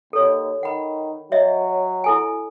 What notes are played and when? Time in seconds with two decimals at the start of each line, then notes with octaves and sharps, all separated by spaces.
0.13 D#2 A4 C#5
0.63 D#3 F#5 B5
1.32 F#3 C#5 D#5 E5
2.04 E4 A4 G#5